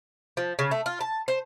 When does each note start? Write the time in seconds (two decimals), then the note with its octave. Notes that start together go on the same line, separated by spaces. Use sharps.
0.37 F3
0.59 C#3
0.71 A3
0.86 F4
1.01 A5
1.28 C5